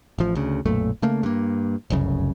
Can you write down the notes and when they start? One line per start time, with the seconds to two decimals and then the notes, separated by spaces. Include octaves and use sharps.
0.18 A1 F3
0.35 D2 C#3
0.65 B1 F#2 A#2 A3
1.02 C#3 A3 A#3
1.23 G2 A#3
1.90 F1 C2 F#2 C#3